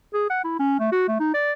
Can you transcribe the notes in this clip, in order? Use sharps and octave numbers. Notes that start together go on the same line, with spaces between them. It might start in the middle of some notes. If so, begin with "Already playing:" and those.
G#4
F#5
E4
C#4
A3
F#4
A3
D#4
D5